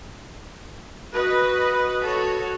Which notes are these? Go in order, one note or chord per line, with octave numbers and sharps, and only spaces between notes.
F#4 B4 D#5
F#4 A4 C#5